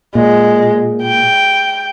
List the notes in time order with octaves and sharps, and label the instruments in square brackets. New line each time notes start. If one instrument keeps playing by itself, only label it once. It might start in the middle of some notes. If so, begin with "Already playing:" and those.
[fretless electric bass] A#2 [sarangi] G#3
[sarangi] G5